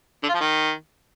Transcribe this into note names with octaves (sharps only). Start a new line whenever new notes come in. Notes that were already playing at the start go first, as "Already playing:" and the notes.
D3
F4
F3
D#3